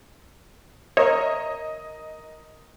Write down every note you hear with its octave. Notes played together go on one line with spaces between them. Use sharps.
A#4 C#5 D#5 E5